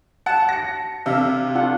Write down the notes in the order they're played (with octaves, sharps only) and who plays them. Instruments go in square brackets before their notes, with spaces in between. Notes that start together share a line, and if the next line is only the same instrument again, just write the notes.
[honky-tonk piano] F#5 [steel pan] A5
[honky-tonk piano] A#6 C#7
[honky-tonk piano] C3 [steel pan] D4 E5 F5
[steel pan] D4 F4 F#5